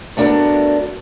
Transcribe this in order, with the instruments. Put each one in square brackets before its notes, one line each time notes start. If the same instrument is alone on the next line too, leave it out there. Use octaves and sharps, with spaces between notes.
[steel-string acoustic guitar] A3 B3 D4 F#4 A#4